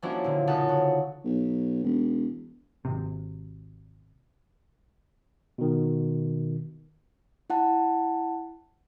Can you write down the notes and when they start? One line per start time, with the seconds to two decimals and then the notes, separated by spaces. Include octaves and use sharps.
0.02 F3 A#3 C#4 D4 E4 F#4
0.24 A#2 D3
0.47 F2 C#3 D#4 A4 F#5
0.69 F#4
1.24 B1
1.84 E1
2.85 G#1 C3
5.58 B2 D#3
7.50 E4 F#5 A5